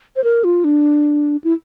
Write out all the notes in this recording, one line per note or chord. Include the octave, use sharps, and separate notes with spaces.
C5
A#4
F4
D4
E4